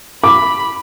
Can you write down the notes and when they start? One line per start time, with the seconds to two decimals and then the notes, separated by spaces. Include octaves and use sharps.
0.23 B5 D6